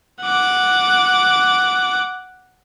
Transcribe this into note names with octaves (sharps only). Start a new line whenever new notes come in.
F#5 D6